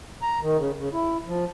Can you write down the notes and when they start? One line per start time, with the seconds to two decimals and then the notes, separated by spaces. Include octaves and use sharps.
0.22 A#5
0.42 D#3
0.58 C#3
0.78 C#3
0.93 E4
1.27 F3